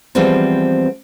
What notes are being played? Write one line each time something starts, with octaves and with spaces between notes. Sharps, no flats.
E3 F3 G3 G#3 B3 C4